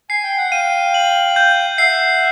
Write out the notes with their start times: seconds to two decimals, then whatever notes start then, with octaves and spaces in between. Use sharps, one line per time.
0.10 G#5 C7
0.23 G5
0.38 F#5
0.51 F5 G5 D#7
0.94 F#7
1.36 G6
1.78 E5 F#5 C7